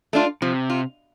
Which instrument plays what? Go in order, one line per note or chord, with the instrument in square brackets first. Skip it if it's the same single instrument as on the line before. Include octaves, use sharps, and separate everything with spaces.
[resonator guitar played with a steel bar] A3 D4 F4
[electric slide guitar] C3 [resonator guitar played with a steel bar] F3
[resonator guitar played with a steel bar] F4